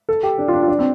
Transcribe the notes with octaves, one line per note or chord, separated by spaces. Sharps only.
A4
G4
D4
F4
D4
F4
D4
C4